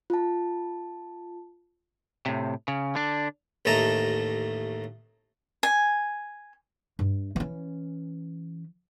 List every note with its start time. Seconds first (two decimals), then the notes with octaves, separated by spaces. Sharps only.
0.10 F4 A5
2.26 A2 C3
2.68 C#3
2.95 D3 D4
3.65 A1 D#2 A3 D#5 A5 A#5
5.63 G#5
6.99 G2
7.36 E3 C#4